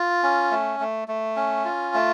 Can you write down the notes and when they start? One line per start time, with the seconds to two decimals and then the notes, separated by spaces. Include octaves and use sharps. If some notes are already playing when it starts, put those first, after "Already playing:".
Already playing: F4
0.23 C#4
0.51 A3
0.80 A3
1.08 A3
1.36 C#4
1.65 F4
1.94 A3